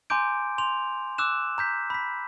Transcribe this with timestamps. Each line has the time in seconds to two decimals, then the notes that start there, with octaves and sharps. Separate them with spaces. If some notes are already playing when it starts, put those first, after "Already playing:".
0.10 G#5 A#5 C6 D6 G6 D7
0.58 C6 F7
1.18 D6 E6 F#6 E7
1.58 A#5 G6 B6
1.90 B5 B6